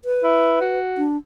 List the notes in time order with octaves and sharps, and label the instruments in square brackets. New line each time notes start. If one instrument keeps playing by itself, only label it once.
[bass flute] B4
[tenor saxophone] E4
F#4
[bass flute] D4